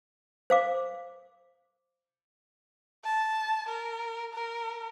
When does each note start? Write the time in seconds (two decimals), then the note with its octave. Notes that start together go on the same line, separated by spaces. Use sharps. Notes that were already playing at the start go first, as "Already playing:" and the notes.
0.50 C5 F5 D6
3.05 A5
3.68 A#4
4.33 A#4